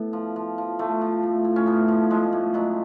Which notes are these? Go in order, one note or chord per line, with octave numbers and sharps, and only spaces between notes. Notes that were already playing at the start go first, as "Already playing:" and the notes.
Already playing: A2 B3
F3
F3
F3
F3 A3
F3
A2
A2
C#4
A2 B3
F3
F3 G#3
A2
B2 F#3